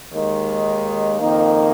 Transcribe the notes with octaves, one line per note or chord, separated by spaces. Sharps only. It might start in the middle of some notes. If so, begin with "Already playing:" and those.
D#2 D#3 G#3
F2 D#3 A#3 D#4